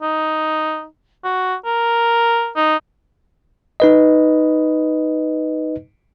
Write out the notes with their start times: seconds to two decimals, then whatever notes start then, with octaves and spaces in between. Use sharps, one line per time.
0.02 D#4
1.24 F#4
1.65 A#4
2.56 D#4
3.80 D#4 B4 D#5